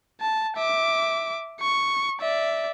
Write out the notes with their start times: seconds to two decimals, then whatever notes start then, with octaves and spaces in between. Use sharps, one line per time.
0.20 A5
0.57 E5 D6
1.61 C#6
2.21 D5 E5